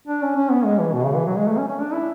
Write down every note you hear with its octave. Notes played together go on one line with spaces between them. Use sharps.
D4
C#4
C#4
B3
G#3
E3
B2
C#3
E3
F#3
G#3
A3
C#4
C#4
D4
E4